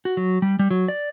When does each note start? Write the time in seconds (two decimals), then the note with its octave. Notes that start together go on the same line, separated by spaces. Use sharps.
0.05 F#4
0.17 F#3
0.42 G3
0.59 G3
0.71 F#3
0.88 D5